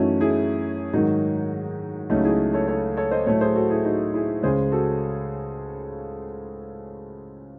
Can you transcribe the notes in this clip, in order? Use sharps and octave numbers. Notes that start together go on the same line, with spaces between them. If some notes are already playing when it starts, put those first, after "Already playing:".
Already playing: F#2 E3 A3 C#4 D#4 E4 F#4
E4 G#4
G#2 D#3 F#3 D#4 F#4
C#2 C#3 F#3 A3 D#4 F#4
E4 G#4
A4 C#5
A4 C#5
A4 C#5
C5 D#5
A2 F#3 A3 A4 C#5
G#4 C5
F#4 A4
E4 G#4
D#4 F#4
E4 G#4
C#2 C#3 G#3 G#4 C5
F#4 A4